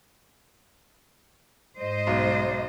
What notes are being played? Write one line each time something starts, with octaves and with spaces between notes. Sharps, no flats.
G#2 C5 D#5
B1